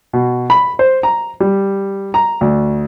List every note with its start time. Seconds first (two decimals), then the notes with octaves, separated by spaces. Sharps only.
0.13 B2
0.50 B5
0.79 C5
1.03 A#5
1.40 G3
2.14 A#5
2.41 D2